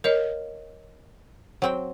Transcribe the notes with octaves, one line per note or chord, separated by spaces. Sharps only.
A#4 C#5 D#5 F5
F#3 C4 G5